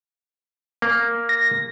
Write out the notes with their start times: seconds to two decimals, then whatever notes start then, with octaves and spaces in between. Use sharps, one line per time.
0.82 A#3
1.29 A#6